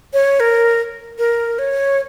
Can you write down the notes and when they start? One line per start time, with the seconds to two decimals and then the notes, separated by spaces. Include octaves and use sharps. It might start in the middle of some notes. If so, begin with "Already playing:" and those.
0.13 C#5
0.40 A#4
1.19 A#4
1.59 C#5